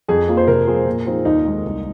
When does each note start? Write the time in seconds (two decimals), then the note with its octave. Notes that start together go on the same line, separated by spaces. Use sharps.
0.08 F2 G#4
0.28 F3 A#3 F4
0.37 C5
0.47 C3 A#4
0.67 F3 C4 G#4
0.86 A#2
1.06 F3 C4 D#4 G#4
1.25 D#2 D#4
1.45 D#3 G#3
1.64 C2